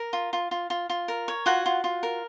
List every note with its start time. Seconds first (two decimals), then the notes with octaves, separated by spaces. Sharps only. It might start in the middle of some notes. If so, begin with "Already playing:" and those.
Already playing: A#4
0.13 F4
0.33 F4
0.51 F4
0.70 F4
0.90 F4
1.08 A#4
1.28 C#5
1.46 F4 F#4 F#5
1.66 F4
1.84 F4
2.03 A#4